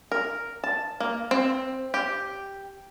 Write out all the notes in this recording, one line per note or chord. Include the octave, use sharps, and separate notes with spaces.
A#4
A5
A#3
C4
G4